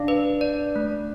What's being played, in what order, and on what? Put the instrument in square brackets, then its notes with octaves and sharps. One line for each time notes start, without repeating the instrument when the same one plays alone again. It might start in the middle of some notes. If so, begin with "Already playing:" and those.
Already playing: [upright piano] D4 [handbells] F5
[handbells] B4
D5
A3